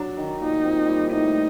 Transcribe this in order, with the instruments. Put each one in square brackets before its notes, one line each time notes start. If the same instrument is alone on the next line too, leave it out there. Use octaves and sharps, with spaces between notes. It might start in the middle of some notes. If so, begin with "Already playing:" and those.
Already playing: [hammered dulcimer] F#3 [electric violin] D4
[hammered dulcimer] D#3
[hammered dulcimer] A#2 [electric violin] D#4
[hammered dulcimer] C4
G3
[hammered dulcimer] A2 [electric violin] D#4